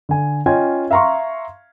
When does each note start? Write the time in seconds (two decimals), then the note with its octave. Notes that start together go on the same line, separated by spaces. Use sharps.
0.09 D3 G#5
0.46 C#4 F4 D#5 G5 G#5 G#6
0.91 E5 F5 A#5 C6 C#6